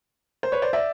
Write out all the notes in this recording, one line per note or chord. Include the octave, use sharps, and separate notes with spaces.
C5
B4 C#5
C5 D5
D5 E5